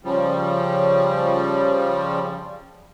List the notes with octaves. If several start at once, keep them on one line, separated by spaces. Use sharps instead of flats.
C#3 F3 G3